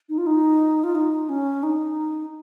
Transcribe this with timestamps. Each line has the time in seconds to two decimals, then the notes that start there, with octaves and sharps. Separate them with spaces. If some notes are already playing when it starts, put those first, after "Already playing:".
0.09 D#4
0.18 F4
0.26 D#4
0.84 F4
0.95 D#4
1.29 C#4
1.63 D#4